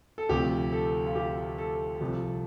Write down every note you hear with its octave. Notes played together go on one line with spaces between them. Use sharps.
A4
D2 C3 F3 G4
A4
F4
G4
A4
C2 C3 F3